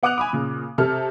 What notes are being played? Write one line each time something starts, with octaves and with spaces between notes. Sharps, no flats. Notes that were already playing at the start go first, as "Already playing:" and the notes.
B3 F#5 D6 D#6 F#6 F7
G#5 B5 D6
A#2 C#3
C3 A4 F6